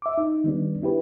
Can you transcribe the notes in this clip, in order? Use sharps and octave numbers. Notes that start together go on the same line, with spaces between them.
E5 D6
D#4
D#3 G3 B3 D4
D4 E4 G4 B4